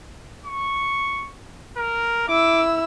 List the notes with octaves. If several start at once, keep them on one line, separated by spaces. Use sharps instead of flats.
C#6
A#4
E4 D6 E6